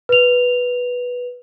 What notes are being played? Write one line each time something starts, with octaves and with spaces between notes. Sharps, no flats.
B4 F7